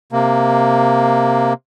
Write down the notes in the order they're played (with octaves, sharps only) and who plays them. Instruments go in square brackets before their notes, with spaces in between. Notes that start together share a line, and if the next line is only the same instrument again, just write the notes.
[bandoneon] C3 A#3